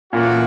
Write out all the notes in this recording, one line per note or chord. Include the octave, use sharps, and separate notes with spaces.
A#2 E3 A3 C#4 F#4